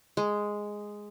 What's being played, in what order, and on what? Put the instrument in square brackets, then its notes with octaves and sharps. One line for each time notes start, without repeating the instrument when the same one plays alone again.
[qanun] G#3